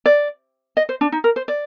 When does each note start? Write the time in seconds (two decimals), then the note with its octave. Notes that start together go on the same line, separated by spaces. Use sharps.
0.06 D5
0.77 D#5
0.89 C5
1.01 D4
1.12 D#4
1.24 A#4
1.36 C5
1.48 D5